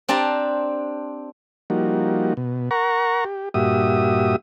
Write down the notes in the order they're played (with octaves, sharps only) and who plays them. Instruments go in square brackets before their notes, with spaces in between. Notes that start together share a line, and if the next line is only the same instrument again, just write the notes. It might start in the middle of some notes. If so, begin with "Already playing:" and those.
[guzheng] C4 D4 G4 A5 A#5
[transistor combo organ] F3 G3 A#3 D#4 F#4
B2
A#4 F#5 A#5 C#6
G4
G2 A#2 F#4 G4 E5 D#6